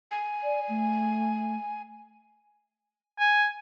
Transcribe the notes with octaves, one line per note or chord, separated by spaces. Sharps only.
G#5
D5
A3
G#5